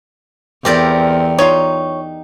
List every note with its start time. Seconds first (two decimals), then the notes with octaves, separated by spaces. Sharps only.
0.65 E2 C4 G4 A#4 D5
1.38 D#4 F4 C#5